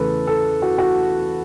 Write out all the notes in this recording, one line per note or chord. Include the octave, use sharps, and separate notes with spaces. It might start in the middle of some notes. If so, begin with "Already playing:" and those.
Already playing: E2 C#3 E3 A3 A4 B4
A4
F#4
F#4